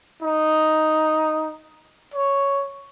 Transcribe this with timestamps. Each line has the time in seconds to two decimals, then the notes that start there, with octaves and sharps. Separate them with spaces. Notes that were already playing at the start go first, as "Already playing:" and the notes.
0.22 D#4
2.14 C#5